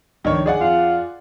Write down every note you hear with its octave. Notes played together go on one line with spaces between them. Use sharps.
C#2 G2 D#3 F3 D4 C#5
G#4 D5 F#5
F2 F4